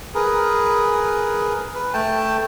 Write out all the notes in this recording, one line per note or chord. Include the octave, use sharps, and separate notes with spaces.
G#4 A#4 B4
B4
A3 G5 A5